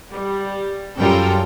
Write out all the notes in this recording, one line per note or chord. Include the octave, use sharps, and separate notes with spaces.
G3
F#2 G3 F4 A4 A#4 G5